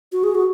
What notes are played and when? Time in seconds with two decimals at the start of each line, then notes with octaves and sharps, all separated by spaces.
0.12 F#4
0.24 G#4
0.35 F#4